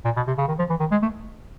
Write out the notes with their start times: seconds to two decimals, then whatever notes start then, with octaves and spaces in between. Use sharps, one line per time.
0.05 A#2
0.17 B2
0.28 C3
0.38 C#3
0.48 D#3
0.59 F3
0.70 E3
0.80 D#3
0.92 G#3
1.03 A3